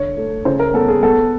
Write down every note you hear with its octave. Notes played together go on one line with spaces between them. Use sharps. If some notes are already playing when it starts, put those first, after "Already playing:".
Already playing: D3 C#5
A3
C#3 C5
A#4
B3 A4
G#4
B3 A4